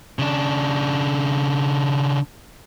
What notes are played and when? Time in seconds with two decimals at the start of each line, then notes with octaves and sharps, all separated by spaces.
0.19 C#3 D4